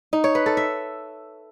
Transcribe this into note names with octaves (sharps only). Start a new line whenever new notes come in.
D#4
C#5
B4
A4
E5